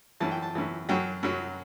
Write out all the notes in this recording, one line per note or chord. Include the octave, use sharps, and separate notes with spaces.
F#2 E3 A5
G5
A5
F#2 E3
F#2 F#3 G5
F#2 F#3